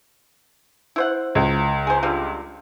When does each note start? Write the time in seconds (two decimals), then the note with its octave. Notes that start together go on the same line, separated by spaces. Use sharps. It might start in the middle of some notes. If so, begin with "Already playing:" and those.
0.96 E4 C5 F#5
1.35 C#2
1.87 G#4 C5
2.03 D3 G3 F4